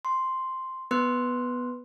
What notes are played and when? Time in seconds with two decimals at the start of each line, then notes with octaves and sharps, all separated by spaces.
0.05 C6
0.91 B3 B4 C6 F#6